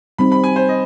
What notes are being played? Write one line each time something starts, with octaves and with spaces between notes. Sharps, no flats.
G3 C4 D#4 B5
B5
G#5
C5
D#5